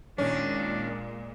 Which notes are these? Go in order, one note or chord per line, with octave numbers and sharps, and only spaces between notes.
A#2 D#3 G#3 C#4 D4